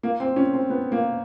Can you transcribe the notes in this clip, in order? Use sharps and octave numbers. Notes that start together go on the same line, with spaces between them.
A#3
C4
C#4
C4
B3
A#3